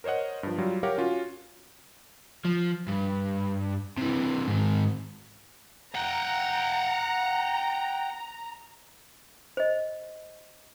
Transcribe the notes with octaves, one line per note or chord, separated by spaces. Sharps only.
A#4 C5 C#5 D#5 F#5
G2 F3
F#3 G3 F4
G4 A#4 C#5 F5 F#5
C#4 F4 F#4
F3
G2
C3 E3
G#2 D#3
F#5 G5 A#5
C5 D#5